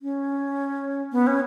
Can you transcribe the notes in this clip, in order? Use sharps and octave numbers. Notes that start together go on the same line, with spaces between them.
C#4
B3
C#4